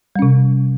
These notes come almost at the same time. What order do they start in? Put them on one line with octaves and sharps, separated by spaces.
G3 C#4 C3